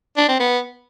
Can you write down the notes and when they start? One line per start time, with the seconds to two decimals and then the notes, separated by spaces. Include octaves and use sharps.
0.17 D4
0.28 C4
0.40 B3